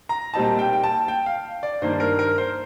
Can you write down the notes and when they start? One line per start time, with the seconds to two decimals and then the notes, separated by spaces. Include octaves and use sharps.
0.09 A#5
0.34 A#2 G3 C4 D#4 A5
0.59 G5
0.73 G5
0.84 A5
1.08 G5
1.26 F5
1.63 D5
1.82 G2 D#3 A#3 D4 C5
2.00 A#4
2.19 A#4
2.38 C5